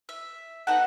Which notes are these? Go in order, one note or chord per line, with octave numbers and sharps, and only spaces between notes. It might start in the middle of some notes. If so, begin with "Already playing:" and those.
E5
B3 D#4 F#4 A4 F#5